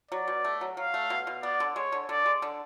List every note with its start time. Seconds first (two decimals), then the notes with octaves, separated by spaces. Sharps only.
0.11 F#3 D5
0.28 B2
0.44 A3
0.61 F#3
0.77 F#3 F5
0.94 A3
1.10 B2
1.27 B2
1.43 B3 D5
1.60 D3
1.76 G#3 C#5
1.92 D3
2.09 D3 D5
2.26 G#3
2.42 D3